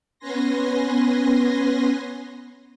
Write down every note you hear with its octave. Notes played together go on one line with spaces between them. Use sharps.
B3 C#4 B4 G#5 C6 A#6